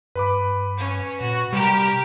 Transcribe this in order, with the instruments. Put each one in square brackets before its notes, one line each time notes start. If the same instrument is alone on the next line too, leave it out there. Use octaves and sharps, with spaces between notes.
[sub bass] G2 [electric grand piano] B4 B5 D6
[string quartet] C#4
[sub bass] A#2 [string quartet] F#4
[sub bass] C3 [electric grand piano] G3 [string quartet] G4 A#4